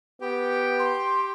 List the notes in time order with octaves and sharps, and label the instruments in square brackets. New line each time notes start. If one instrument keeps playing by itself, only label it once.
[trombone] B3 [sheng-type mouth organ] G4 G5
[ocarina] C6